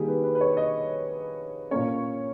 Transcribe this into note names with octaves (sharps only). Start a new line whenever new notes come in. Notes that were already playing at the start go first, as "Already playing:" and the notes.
Already playing: D#3 G3 A#3 G4 G#4
B4
B4
B4
C#5
D#5
A#2 A#3 C#4 C#5